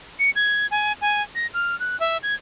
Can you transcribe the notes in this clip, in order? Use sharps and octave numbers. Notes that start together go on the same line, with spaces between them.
C#7
G#6
G#5
G#5
A#6
F6
F#6
E5
G#6